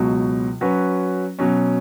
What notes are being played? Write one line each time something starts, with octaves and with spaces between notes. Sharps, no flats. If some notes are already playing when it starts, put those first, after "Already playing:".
Already playing: C#2 B2 F#3
F#3 C#4 F#4 B4
B2 F#3 C#4